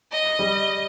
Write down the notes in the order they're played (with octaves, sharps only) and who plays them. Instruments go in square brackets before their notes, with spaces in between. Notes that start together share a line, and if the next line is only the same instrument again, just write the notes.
[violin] D#5
[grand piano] G3